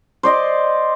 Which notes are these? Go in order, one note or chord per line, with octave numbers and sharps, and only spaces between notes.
C5 D5 D#5